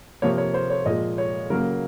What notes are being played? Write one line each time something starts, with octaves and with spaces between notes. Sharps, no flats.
C3 F3 A#3 C#5
C#5
C5
C#5
A#2 F3 G#3 D#5
C#5
C#3 F#3 A#3 A#4